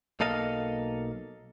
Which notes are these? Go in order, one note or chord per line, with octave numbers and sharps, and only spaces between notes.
B1 A#3 A4 D#5 F5